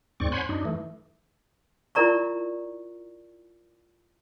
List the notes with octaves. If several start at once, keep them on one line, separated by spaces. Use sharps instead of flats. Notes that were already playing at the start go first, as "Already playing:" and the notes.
D#2 G#2 C4 D5 C#6
C5 C#5 F#5 G#5 B5 C6
F#2 D4 D#4
E3 A3
E4 F4 A#4 D5 A#5 C#6